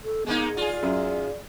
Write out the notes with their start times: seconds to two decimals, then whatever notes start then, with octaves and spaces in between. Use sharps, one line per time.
0.04 A4
0.26 G#3 A#3 B3 D#4
0.57 F4 G#4 D5
0.83 F#2